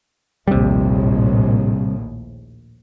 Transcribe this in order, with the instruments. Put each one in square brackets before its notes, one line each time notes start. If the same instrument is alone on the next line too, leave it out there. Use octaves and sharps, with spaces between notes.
[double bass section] A#1 D#2 A2 [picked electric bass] C3 G3